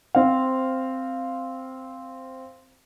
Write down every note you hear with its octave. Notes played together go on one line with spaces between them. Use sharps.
C4 C5 F5